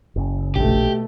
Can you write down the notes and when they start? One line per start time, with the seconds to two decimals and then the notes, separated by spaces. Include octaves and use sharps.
0.16 F#1 C#3
0.56 A#1 B2 A3 G4